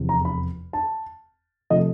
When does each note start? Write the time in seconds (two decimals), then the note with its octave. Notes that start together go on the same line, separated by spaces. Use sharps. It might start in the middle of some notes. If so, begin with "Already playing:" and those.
Already playing: F1 E2 C3
0.09 A#5
0.25 B5
0.73 A5
1.70 C3 F3 A3 D#5